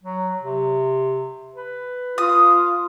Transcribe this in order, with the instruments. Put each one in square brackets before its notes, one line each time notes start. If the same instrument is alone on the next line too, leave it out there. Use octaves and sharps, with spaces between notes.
[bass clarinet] F#3
C3
B4
[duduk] F4 [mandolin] D#6